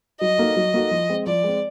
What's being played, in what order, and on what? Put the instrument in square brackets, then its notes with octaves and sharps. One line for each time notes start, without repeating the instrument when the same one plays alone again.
[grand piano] F#3 [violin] D#5
[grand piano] A#3 D#4 F#4 A4
F#3
A#3 D#4 F#4 A4
F3
G#3 C4
[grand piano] F3 [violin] D5
[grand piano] G#3 C4